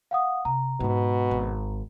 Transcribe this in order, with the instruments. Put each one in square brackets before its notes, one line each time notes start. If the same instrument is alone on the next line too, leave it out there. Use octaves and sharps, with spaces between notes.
[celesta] F5 F#5 D#6
[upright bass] C3 [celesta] A#5
[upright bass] G#2 G#3 [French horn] B2
[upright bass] G#1